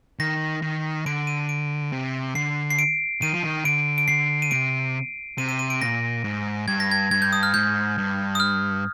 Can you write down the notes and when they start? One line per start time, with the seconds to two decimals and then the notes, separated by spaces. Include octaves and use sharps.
0.19 D#3 A#6
0.62 D#3
1.06 D3 D7
1.27 D#7
1.49 D7
1.92 C3
2.35 D3 C7
2.71 C7
2.79 D7
3.22 D#3 D#7
3.33 F3
3.43 D#3
3.65 D3 D7
3.98 D7
4.08 D3 C7
4.42 D#7
4.51 C3 D7
5.38 C3 D#7
5.49 D#7
5.59 D#7
5.70 D7
5.81 A#2 A#6
6.24 G#2
6.68 G2 G#6
6.80 A#6
6.91 G#6
7.11 G2 G#6
7.22 G6
7.33 D#6
7.43 F6
7.54 G#2 G6
7.98 G2
8.35 D#6
8.40 F6